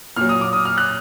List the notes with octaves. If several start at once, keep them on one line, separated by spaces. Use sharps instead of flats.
A#2 F#3 F6
D#6
D6
D#6
F6
F#6